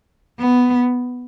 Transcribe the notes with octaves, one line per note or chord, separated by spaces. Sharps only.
B3